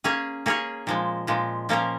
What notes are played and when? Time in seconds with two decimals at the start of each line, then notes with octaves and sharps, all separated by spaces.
0.04 A#3 C#4 G#4 C#5
0.46 A#3 C#4 G#4 C#5
0.87 A#2 F3 G#3
1.27 A#2 F3 G#3
1.69 A#2 F3 A#3 C#4 A#4